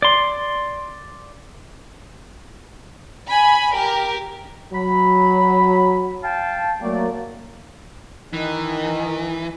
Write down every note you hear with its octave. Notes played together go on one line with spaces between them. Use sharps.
D5 C6
G#5 B5
G4 A#4
F#3 B5
F5 G5 A5
F#3 A3 A#3 D5
D#3 E3